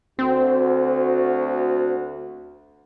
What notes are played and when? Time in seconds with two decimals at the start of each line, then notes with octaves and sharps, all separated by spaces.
0.19 D2 C4 F#4